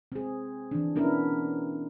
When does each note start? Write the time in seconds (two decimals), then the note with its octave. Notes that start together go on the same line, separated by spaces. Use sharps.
0.12 C4 G#4
0.71 E3 D4
0.96 B3 C#4 D4 E4 A#4